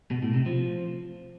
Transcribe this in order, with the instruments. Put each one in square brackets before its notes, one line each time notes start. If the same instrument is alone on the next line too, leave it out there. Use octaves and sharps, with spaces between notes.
[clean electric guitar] B2
A2
C3
F3